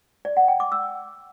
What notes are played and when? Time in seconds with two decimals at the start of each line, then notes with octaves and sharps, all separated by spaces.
0.25 D5
0.37 F#5
0.48 G5
0.60 D6
0.72 E6